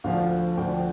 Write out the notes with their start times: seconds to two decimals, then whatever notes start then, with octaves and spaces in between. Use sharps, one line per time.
0.04 D2 D3 F3 F5
0.57 D2 D3 F3 G5